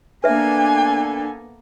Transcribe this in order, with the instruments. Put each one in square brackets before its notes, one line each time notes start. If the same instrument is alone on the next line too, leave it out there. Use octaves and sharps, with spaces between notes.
[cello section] A#3 B3 A4 [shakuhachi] D4 [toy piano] B4 E5 [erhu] G#5